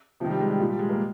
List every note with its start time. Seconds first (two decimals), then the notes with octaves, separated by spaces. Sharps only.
0.20 C3 F3
0.25 D#3
0.30 G3
0.40 G#3
0.50 G3
0.60 A#2 F3
0.70 G3
0.79 G#3
0.89 A#3